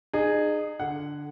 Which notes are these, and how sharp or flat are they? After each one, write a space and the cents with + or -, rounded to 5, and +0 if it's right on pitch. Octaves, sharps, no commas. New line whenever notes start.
D#4 -35 G#4 +0
D3 +0 F#5 +0